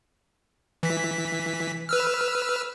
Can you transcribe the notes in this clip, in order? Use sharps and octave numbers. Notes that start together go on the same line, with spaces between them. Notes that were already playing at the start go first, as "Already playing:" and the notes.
E3 B6
B4 E6 F6